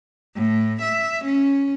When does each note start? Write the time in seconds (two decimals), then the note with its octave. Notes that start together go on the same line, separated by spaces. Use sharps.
0.36 A2
0.82 E5
1.25 C#4